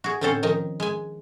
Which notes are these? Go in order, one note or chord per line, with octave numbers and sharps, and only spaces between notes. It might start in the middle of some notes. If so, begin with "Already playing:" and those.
F#4 G#4
A2 D3 C4 C#4 A4 C5
D#3 F3 D#4 A#4
G#3 G#5